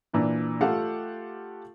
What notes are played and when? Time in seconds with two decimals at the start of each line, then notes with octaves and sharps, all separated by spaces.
0.13 A#2 E3 D4
0.61 A3 F4 G4 A4 F5 F#5